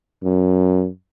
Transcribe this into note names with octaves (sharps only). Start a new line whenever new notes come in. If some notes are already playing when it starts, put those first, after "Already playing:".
F#2